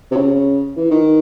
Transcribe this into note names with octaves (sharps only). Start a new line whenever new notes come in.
C3
C#3
E3
D#3